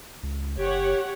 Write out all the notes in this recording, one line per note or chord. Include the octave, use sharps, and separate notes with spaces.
C#2
F#1 G4 C#5 F#5